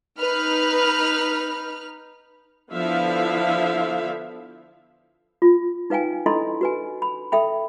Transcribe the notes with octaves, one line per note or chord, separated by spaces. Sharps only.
D#4 B4 F6
D3 F3 B3 E4 E5 F5
F4
D#4 B4 F5 G5 G#5
D4 E4 A4 D#5 B5 C6
F#4 B4 G#5
B5
A4 E5 G5 B5